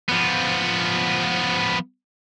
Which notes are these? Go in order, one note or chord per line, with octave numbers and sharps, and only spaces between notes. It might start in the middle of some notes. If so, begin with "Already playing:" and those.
F3 B3